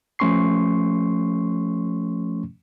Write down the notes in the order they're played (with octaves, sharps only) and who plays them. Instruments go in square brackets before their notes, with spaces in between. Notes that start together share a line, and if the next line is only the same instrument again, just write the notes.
[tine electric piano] F3 A3 C#4 C6 C#6 C7